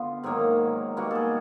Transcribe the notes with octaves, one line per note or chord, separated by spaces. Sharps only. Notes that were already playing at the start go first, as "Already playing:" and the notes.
Already playing: D3 B3 F4
G#2 D#3 F#3 A#3
B2 G3 A#3 F#4
G#4 A4